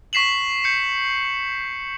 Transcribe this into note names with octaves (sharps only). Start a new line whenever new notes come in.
C#6 B6 C7 E7 F#7
G6 C#7